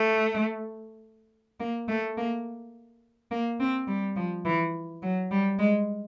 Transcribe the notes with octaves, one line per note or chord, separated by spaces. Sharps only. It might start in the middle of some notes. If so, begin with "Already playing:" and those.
Already playing: A3
A#3
A3
A#3
A#3
C4
G3
F3
E3
F#3
G3
G#3